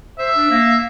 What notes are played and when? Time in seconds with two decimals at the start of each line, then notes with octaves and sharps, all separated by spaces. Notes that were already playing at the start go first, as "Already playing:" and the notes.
0.18 C5 E5
0.35 D4
0.51 A#3